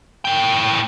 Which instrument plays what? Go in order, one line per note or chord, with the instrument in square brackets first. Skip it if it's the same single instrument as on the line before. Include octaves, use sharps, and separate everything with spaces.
[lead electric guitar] A2 G5